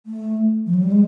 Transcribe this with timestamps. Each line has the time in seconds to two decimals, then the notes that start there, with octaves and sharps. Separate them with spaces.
0.06 A3
0.66 F3
0.74 F#3
0.83 G3
0.92 G#3